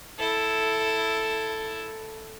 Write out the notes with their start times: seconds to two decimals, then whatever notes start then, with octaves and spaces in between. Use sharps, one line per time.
0.18 E4 A4